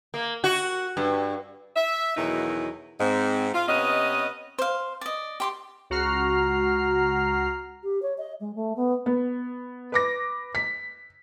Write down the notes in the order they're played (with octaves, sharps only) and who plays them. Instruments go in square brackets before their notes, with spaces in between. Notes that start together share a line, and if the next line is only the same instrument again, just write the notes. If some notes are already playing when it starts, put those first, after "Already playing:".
[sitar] A#3
F#4
G2
[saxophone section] E5
E2 B2 D#3 F#3 D#4 E4
G#2 C4
F4
C3 B3 C#4 B4 D#5
[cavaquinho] C5 F5
D5 D#5
G4 C6 D6
[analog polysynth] C#2 F#4 A#5 F6 C7
[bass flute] G4
C#5
D#5
G#3
A3
B3
[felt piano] B3
B4 D6 A#6
B6